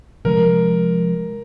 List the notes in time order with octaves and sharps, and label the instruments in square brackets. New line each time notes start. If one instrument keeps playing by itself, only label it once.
[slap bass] C3 F3 G#3 [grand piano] A#4